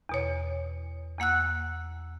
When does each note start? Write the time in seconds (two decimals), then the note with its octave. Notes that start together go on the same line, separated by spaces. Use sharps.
0.09 E2 B2 C#5
1.19 E2 A#3 F#5 E6 F#6